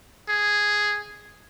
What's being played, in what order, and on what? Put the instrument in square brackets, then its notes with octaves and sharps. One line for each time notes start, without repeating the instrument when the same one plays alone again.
[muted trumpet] G#4